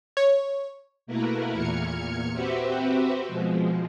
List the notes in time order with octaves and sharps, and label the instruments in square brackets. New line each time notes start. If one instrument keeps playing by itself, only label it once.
[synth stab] C#5
[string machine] B2 A3 A#3 E4 A#4 B4
E2 A#2 F6 G#6 C#7
C4 F#4 G4 B4 C5 E5
B2 F3 G#3